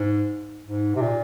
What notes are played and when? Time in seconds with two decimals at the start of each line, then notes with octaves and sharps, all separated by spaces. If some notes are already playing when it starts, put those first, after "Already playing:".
Already playing: G#2
0.66 G#2
0.96 C3
1.02 A#2